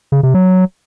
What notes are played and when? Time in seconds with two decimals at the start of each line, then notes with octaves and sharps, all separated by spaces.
0.12 C#3
0.23 C3
0.34 F#3